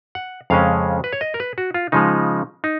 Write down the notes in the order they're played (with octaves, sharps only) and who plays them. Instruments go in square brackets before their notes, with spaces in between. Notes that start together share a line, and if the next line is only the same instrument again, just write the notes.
[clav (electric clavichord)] F#5
F2 C#3 G#3 C#4 F5
B4
C#5
D#5
A#4
B4
F#4
F4
C#3 F3 G#3 D#4
D#4